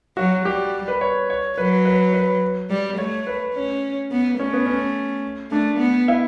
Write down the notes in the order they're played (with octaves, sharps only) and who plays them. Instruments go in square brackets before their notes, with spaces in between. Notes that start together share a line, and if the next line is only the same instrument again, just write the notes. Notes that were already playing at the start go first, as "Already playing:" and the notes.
[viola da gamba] F#3 [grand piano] F#4
[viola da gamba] G3 [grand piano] G4
[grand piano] B4
C#5
C#5
[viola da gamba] F#3 [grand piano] B4
[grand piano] B4
B4
[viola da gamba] G3
[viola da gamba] A3 [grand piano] C#5
[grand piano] B4
[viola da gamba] C#4
B3
[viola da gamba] A3 [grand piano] C#4
[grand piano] B3
C#4
[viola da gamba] A3 [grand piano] D4
[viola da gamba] B3
[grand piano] E4